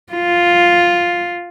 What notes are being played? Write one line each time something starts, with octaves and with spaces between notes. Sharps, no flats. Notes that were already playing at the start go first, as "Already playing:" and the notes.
F4